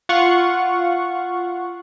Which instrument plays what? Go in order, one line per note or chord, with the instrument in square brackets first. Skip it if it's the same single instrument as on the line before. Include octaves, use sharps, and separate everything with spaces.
[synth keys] F4 F5 F#5 C#6